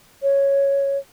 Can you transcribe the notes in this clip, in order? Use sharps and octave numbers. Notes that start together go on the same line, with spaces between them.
C#5